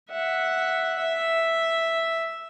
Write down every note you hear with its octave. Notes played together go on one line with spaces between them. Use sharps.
E5 F#5
E5